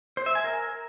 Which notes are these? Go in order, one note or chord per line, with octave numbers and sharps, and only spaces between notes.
C5
E5
G#5
A#4